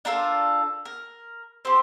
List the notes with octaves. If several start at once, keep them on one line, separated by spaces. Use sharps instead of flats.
D4 F4 A4 A#4
A#4
C4 G4 C5